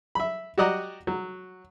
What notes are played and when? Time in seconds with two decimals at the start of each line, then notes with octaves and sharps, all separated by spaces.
0.15 E5 B5
0.58 F#4 G4 D5 D#5 F#5 A#5
1.07 F#3